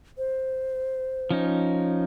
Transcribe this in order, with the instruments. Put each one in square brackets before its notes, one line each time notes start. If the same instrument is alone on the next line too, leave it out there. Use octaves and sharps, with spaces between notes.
[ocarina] C5
[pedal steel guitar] F3 C#4 D#4